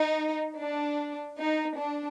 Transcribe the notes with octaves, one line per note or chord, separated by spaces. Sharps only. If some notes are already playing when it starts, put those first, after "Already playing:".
Already playing: D#4
D4
D#4
D4